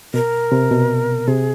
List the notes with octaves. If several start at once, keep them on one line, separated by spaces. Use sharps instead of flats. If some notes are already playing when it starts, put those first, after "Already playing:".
B2 A#4
C3
B2
C3 G#4